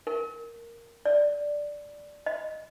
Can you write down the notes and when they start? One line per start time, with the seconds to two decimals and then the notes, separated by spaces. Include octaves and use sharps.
0.07 A#4
1.05 D5
2.26 D#5